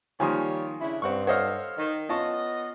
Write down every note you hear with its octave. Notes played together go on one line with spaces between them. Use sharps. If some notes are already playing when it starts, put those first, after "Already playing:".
D#3 F3 G3 A#3 C#5 G#5 C6 D#6
C#3 D4 E4
G2 C4 F#5 C#6
A4 C5 C#5 D#5 F5 F#5
D#3
B3 C#4 F4 D#5 A5 C#6